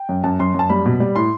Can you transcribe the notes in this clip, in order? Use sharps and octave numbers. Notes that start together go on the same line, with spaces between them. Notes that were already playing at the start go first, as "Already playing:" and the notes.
Already playing: G5
F#2
F#2 A5
F#2 C6
F#2 A5
G3 B5
B2
G3
A2 C6